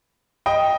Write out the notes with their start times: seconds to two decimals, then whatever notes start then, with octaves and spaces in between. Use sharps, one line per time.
0.46 D#5 G5